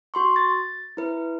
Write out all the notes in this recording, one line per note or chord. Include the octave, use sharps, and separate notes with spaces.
F#4 C6 C#6
A6
E4 B4